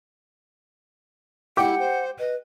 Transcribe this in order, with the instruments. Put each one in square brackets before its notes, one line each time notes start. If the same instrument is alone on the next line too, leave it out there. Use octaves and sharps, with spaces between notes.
[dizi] E4 [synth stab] G4 [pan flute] F#5 [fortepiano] G5 D6
[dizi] C5
[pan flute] B4 [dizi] D#5